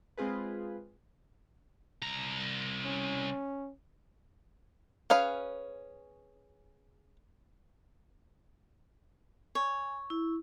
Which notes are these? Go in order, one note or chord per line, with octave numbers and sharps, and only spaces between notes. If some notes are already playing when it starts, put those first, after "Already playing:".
G#3 C4 F4 G#4 B4
C2 A#5
C#4
C#4 G#4 B4 F5
C#5 G#5
E4